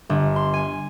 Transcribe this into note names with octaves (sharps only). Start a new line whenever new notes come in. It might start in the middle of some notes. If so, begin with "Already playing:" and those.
G1
C6
G#5